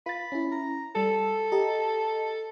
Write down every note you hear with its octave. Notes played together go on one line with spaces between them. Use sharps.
F4 B5 A6
C#4 E4
A#5
G3 A4 E6
G4 D#5 A#5